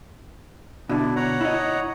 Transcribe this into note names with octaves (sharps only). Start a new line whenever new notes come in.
B2 D3 D4 E4
C#5 F#5 A#5
E4 D#5